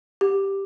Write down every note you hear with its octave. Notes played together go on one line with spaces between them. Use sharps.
G4